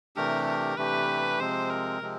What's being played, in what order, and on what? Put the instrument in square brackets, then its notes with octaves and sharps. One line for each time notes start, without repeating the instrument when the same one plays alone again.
[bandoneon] C3 E3 A3 D4 G4 [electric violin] A#4
[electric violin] A#4
[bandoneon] C3 E3 A3 D4 G4 [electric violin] B4
[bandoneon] C3 F3 G#3 C4 [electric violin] C5
[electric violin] A#4
[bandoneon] C3 F3 G#3 C4